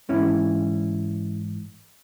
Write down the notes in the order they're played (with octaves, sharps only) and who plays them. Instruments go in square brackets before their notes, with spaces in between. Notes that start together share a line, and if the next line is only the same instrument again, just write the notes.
[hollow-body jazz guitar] G#2 E3 C#4 E4